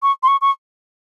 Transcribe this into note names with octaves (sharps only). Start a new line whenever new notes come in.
C#6
C6
C#6
C#6